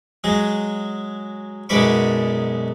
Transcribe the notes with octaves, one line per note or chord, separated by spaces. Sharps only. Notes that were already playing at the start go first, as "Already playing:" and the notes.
F#3 G#3 G#4
B1 F#2 G#3 D5 B5 C#6